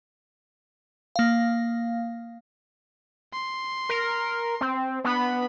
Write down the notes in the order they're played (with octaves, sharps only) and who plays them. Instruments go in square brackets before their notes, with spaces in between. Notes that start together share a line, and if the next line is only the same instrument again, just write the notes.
[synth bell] A#3 F5
[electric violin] C6
[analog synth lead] A#4
C4
[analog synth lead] B3 [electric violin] D4 B5